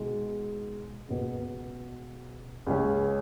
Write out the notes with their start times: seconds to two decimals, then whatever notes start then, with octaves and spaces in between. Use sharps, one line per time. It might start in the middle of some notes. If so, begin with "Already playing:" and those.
Already playing: B2 G#3 D#4
1.08 C#2 B2 B3
2.67 C#2 C#3 G#3 C#4